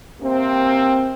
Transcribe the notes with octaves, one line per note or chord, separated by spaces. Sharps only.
C3 A#3 C4